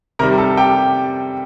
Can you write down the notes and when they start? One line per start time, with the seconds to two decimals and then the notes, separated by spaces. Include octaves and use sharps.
0.19 C3 D#3 G3 A#4 A#5
0.38 A4 A5
0.57 G4 G5